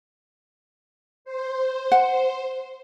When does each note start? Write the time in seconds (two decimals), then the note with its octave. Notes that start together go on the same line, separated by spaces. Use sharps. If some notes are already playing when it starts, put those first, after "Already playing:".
1.25 C5
1.92 F#5